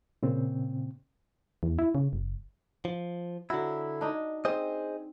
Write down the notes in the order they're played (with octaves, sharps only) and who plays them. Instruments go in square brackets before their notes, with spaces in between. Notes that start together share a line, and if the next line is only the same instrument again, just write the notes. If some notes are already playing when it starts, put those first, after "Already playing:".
[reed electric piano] A#2 C#3 C4
[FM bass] E2
E4
C#3
F#1
[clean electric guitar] F3
[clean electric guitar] D3 E4 [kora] F#3
[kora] D4 D#4
[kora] C4 [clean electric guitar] G#4 C5 D#5